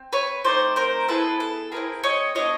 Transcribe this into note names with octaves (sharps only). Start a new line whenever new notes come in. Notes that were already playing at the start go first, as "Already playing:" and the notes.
Already playing: C4
B4 C#5
A3 C4 D#4 C5 D5
A#4 C5
B3 E4 G#4 A4 B4
A4
C4 E4 G#4 A#4
C#5 D#5
B3 D4 F4 C#5 D#5